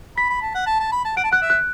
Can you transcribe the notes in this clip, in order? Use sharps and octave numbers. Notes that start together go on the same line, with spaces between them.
B5 B6
B5
A5
F#5
A5
A5
B5
A5
F#5 D7
A5
F#5 F#6
E5
F#6